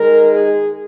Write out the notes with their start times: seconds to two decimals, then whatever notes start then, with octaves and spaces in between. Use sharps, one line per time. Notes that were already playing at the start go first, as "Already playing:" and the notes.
Already playing: D#3 G#3 A#4
0.30 G#4